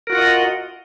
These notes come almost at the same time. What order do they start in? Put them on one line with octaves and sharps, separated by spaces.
A#4 F#4 F4 F#5 D#5